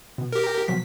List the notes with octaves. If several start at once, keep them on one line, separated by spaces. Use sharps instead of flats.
B2
G4 A#4
B2 F3 F#3 B6